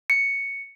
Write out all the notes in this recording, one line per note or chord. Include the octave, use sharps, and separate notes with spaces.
C#7